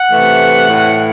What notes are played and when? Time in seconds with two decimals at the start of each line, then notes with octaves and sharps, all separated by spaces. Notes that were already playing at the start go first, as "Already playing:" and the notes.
Already playing: F#5
0.11 C3 E3 A3
0.68 A2 E3 A3